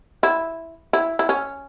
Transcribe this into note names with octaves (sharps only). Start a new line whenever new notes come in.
E4
E4
E4
C#4